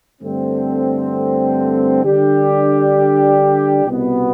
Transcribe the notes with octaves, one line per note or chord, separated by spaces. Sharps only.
G2 D3 A3 C4
D3 G3 D4 G4
C2 B2 B3